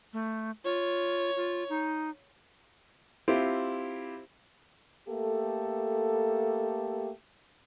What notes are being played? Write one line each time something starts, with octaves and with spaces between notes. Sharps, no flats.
A3
F4 C#5
F4
D#4
C4 E4 F4 G4
A3 A#3 G4 A4